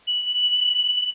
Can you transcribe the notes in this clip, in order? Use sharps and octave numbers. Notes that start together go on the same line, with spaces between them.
F#7